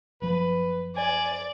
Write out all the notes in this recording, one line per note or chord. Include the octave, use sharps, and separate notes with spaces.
F#1 F3 B4
D5 G#5